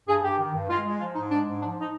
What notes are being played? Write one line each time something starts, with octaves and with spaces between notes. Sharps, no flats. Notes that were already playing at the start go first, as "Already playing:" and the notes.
G2 G#4
G2 G4
D#3
G2
G#3 F4
G#3
F3 F4
G#2 D#4
G#3 D4
G#2
F3 D4
D#4